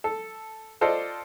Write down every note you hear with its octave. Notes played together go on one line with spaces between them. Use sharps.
A4
F4 A4 C5 D5 D#5